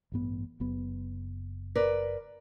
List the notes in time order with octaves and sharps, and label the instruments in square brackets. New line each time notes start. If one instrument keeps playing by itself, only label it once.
[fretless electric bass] A1 G2 B3
F#1 F#2 B3
[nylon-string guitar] A#4 B4 D5